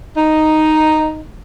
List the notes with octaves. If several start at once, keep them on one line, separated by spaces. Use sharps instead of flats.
D#4